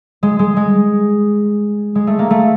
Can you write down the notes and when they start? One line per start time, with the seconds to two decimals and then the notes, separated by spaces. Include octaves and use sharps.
0.23 G#3
0.39 G#3
0.56 G#3
1.95 G#3
2.07 A3
2.19 A#3
2.30 A3